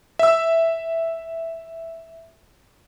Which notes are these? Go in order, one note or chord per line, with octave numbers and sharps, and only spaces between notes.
E5 E6